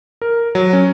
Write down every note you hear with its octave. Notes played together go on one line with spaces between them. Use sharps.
A#4
F#3
C#4